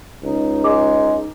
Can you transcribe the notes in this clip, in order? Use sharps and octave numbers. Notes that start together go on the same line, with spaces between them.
C#2 D#4
G#3 D6